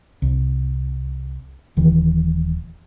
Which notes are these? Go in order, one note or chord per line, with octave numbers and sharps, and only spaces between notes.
C2
D#1 D#3 E3